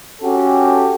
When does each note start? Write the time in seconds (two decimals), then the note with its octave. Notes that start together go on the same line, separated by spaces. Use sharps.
0.22 C#4 F#4 G4 A4